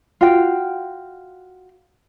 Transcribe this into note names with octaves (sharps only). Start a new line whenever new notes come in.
F4 F#4 G5